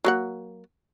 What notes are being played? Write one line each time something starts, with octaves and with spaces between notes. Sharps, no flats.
F#3 A#3 F#5